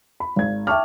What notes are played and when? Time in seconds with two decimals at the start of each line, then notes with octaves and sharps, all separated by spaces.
0.20 B5
0.36 G#1 G#6
0.67 E5 G5 A5 C#6 D6 F6